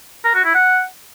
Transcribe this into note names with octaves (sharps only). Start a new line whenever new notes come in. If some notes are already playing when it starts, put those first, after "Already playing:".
A#4
F#4
E4
F#5